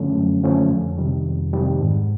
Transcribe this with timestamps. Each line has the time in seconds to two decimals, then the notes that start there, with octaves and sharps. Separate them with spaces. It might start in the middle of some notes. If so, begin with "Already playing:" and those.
Already playing: F#2 D3 F3 A3 C#4
0.16 F#2
0.44 D3 F3 A3 C#4
0.70 F2
0.98 C3 D#3 G3
1.26 F2
1.53 C3 D#3 G3
1.80 G#2